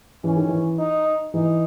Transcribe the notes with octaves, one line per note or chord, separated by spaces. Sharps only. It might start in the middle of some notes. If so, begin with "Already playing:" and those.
E3 C#4
D#3
E3
D#4
E3 D#4